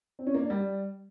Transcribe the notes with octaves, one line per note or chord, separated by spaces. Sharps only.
C4
C#4
A#3
D4
G3